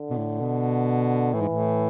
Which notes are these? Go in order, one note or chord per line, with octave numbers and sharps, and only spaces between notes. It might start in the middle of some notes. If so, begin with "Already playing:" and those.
Already playing: D3
B2
A2
B2
A2 E3
G#2
A2